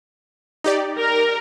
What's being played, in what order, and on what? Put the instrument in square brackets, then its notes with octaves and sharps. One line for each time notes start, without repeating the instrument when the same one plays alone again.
[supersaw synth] D#4 G4 D5
[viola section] A#4